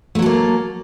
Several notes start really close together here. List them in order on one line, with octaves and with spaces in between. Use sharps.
A3 F#3 A4 A#3